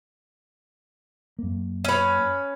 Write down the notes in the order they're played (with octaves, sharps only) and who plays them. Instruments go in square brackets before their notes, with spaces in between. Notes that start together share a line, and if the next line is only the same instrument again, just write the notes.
[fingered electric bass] F#2 A#3
[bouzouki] C#4 B4